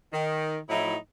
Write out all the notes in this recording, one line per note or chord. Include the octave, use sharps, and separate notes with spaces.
D#3
A2 F3 F#3 D#4 E4